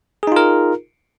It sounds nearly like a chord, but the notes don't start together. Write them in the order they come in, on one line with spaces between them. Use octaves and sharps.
G#4 D#4 F4 A#4